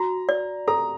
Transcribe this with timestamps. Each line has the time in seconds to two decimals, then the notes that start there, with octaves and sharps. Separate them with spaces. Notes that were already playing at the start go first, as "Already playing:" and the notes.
Already playing: F#4 A#5
0.29 D5
0.68 A4 A#5